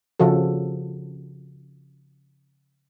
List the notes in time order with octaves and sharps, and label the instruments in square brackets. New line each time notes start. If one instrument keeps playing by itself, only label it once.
[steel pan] C#3 F3 F#4 A4